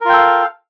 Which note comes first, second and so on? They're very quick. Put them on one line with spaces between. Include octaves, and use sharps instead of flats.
A#4 F4 G5 A4 F5